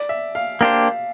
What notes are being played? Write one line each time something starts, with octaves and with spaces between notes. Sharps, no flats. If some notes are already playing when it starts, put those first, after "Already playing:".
Already playing: D5
E5
F5
A#3 D4 G4 C5 F5